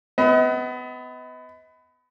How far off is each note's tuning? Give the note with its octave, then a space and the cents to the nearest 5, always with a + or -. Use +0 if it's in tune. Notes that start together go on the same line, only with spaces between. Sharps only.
B3 +25 D#5 +40